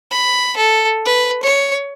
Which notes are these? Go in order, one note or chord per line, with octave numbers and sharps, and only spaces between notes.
B5
A4
B4
C#5